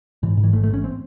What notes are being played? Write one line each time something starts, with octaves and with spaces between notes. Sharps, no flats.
G#2 E3
G#2
E3
A1 A3
A3
A1 C#4
C4